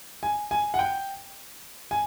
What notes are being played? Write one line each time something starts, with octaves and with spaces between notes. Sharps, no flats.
G#5
G#5
F#5
G5
G#5